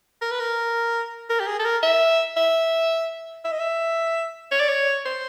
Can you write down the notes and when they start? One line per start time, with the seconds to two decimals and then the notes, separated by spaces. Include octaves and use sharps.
0.22 A#4
0.31 B4
0.40 A#4
1.30 A#4
1.40 G4
1.47 G#4
1.59 A4
1.65 A#4
1.83 E5
2.37 E5
3.44 E5
3.52 D#5
3.59 E5
4.51 C#5
4.60 D5
4.69 C#5
5.06 C5